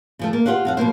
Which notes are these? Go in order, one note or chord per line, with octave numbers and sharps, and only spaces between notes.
C#3 F3 A3
A#3
F4 G4 C5 F5 F#5
F2 F5 F#5
B2 F3 A#3 C5